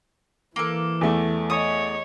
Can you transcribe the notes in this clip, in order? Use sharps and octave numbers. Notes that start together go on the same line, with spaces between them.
E3 A#3 A4
E2 A3
C#5 D#5 D#6